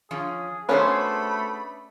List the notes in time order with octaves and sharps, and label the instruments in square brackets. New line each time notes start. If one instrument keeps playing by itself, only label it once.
[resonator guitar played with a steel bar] F3 C#4 [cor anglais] G#4
[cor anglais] A3 [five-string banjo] B3 C#4 D4 [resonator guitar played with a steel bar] F#4 G#4 C5 [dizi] B5